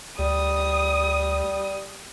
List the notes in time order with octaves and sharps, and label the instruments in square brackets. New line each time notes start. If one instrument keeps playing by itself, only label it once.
[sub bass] D2 [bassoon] G3 [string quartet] D#6